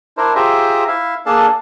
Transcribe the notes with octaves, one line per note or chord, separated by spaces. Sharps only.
D4 E4 A#4 C5
F4 G4 G#4 C5 E5 A#5
E4 E5 F5
A#3 D4 G#4 A4 F5 A5